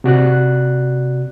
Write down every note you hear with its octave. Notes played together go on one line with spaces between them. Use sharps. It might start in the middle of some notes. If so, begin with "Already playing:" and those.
C3 F#4 D5 F#6